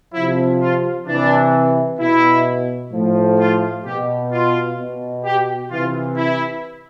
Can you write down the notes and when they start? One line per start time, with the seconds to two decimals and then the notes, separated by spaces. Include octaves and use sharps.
0.14 C3 F3 E4
0.61 F4
1.07 C3 E3 D4
2.00 B2 E4
2.93 A2 F3
3.39 F4
3.85 B2 G4
4.32 F4
4.78 B2
5.25 G4
5.71 C3 E3 F4
6.17 E4